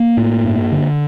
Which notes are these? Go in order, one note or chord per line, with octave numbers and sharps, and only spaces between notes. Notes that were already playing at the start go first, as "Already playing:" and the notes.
Already playing: A#3
A2
G2
D3